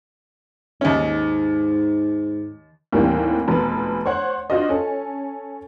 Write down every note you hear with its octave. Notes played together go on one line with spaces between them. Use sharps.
D#2 G#2 C#4
D#2 A2 E3 G3 A#3 C4
F1 B2 G#3 B4
C5 C#5 F#5
D4 F4 F#4 C5 D#5
C#4 A4